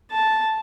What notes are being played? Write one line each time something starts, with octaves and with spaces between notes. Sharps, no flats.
A5